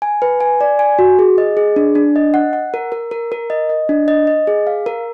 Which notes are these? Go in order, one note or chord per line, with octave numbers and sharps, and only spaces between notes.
G#5
B4
G#5
D5
G#5
F#4
G#4
D#5
G#4
D4
D4
D#5
F#5
F#5
A#4
A#4
A#4
A#4
D#5
D#5
D4
D#5
D#5
G#4
F5
A#4